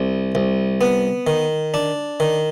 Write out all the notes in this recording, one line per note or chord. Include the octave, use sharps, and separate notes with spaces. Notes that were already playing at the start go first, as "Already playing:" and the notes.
Already playing: C2
C2
B3
D#3
D4
D#3